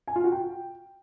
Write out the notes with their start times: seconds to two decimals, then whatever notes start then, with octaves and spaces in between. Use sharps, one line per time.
0.08 G#5
0.16 F4
0.24 F#4
0.32 G5